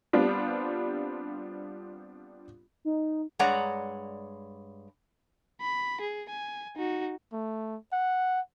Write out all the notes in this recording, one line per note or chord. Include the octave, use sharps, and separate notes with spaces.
G3 B3 C4 D4 F4
D#4
G2 G#3 C#5 D5 F#5 A#5
B5
G#4
G#5
D#4 F#4
A3
F#5